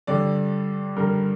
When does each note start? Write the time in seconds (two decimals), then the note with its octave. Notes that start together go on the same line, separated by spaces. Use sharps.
0.07 G2 D3 G3 D5
0.96 G2 D3 G3 A#4